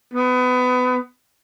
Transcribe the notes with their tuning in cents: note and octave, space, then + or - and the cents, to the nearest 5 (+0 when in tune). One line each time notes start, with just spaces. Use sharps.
B3 +25